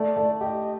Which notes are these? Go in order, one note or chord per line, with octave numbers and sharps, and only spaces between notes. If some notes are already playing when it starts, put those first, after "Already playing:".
Already playing: A3 D5
A3
G4 D#5